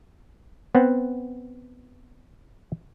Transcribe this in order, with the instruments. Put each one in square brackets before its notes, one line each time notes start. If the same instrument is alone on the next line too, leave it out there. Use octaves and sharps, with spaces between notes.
[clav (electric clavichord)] B3 C4 F#5